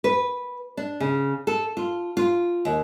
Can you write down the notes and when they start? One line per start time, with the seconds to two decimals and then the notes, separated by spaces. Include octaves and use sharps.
0.04 B4
0.77 D4
1.00 C#3
1.47 A4
1.77 F4
2.17 F4
2.65 D#2